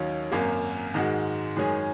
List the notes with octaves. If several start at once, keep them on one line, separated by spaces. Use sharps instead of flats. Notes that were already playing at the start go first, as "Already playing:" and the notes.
Already playing: D#2 D#3 F#3 C#4
G#1 F#2 F#3 A#3
G#2 D#3 G#3 F#4
F#2 D#3 G#3 C#4 G#4